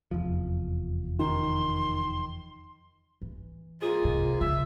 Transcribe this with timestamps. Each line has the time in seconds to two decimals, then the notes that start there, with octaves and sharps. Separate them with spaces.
0.11 F1 E2 F3
1.19 D#3 C6
3.22 E3
3.82 G#2 A#3 F4 G#4
4.05 C3
4.41 C#3 E5